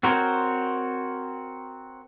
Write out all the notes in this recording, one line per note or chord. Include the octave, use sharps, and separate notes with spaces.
C4 F#4 A#4 C5 C#5